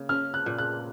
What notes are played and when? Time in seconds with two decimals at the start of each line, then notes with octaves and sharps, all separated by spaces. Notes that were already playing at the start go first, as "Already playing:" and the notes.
Already playing: C#3 A#3
0.09 C#4 F6
0.34 F#6
0.46 A#2
0.58 F#6